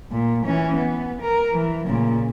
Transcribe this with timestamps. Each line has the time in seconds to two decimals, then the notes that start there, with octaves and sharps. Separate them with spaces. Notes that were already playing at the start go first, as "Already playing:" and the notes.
0.11 A#2
0.46 E3 C#4
0.76 B3
1.22 A#4
1.52 E3
1.87 A#2 C#3